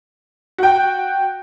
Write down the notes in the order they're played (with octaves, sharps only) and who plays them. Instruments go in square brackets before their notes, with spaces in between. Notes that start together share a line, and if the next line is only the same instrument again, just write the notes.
[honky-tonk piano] F#4 G5